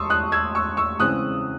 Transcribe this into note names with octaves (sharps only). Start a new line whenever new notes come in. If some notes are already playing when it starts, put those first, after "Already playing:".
Already playing: E1 D#2 A5 C6 C#6 D#6 E6
D#6 F#6
E6 G#6
C#6 E6
C#6 E6
E2 C#3 G#3 C4 D#6 F#6